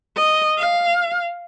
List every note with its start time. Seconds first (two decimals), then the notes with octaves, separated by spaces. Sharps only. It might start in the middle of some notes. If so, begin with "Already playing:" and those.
0.16 D#5
0.58 F5